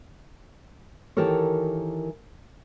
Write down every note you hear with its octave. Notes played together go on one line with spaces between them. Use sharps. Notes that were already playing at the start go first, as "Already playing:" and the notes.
D#3 E3 G4 A4 A#4 C#5